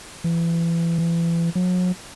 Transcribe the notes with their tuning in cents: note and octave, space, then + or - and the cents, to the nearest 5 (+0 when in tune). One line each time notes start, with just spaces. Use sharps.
E3 +30
E3 +35
F#3 -35